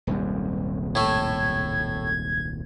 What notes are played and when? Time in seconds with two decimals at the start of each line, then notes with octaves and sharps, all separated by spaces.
0.07 D#1 C2 F#2
0.95 A2 A3 G#6